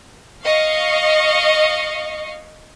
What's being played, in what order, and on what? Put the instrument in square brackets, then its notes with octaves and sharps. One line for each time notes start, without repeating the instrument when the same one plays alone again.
[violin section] D#5 F5 C#6